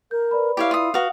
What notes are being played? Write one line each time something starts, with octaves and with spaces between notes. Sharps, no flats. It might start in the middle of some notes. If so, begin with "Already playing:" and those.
A#4 G6
B4 D5 B5
E4 G4 C#5 F5
F4 D#6
F#4 B4 F5 D#6